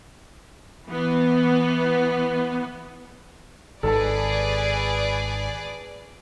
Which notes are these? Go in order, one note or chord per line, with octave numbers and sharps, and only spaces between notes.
E3 B3
G#1 G#2 D#3 G#4 A4 B4 D5 A5